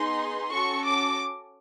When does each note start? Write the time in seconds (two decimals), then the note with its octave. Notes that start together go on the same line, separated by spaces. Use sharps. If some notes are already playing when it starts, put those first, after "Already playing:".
Already playing: B3 D#4 G#4 C6
0.50 C#4 F#4 A4 C#6
0.85 D6